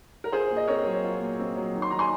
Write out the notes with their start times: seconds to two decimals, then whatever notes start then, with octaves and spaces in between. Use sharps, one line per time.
0.24 A#4
0.32 F4 G#4 C5
0.50 A#2
0.57 D#5
0.68 C4 A#4 C#5
0.85 F#3
1.03 F4
1.21 A#2
1.39 C4
1.57 F#3
1.75 D#3
1.82 C6
1.91 D#3 A#5
1.99 G#5 C6